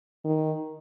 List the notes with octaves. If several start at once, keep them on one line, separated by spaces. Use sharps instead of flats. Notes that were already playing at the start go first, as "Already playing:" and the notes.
D#3